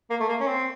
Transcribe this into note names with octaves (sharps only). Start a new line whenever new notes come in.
A#3
A3
A#3
C#4
C4